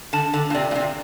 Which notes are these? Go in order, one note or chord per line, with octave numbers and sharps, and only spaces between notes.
D3 A5
D3
A#2
C3 D5
A#2
C3